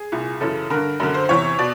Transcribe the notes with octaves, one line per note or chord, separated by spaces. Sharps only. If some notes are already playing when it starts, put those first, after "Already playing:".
Already playing: G#4
C2 A#2
F#2 C#3 E3 A4
G2 D3 A#4
F#2 D3 A#4
C5
E2 C3 E3 C#5
B2 D5